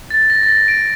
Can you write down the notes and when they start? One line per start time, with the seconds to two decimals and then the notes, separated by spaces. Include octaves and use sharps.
0.10 A6
0.30 A#6
0.43 A6
0.49 A#6
0.68 D7